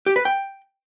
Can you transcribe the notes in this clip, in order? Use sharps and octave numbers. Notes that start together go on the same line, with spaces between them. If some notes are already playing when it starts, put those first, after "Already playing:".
G4
B4
G5